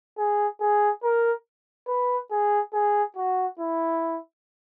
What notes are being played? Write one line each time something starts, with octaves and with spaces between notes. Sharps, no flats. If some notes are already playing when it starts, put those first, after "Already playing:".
G#4
G#4
A#4
B4
G#4
G#4
F#4
E4